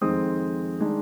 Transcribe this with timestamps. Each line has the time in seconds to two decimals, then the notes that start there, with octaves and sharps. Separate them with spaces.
0.01 F2 D#3 G#3 C4 D#6
0.80 D#3 G#3 D4